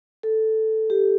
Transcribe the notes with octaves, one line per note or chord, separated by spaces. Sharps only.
A4
G4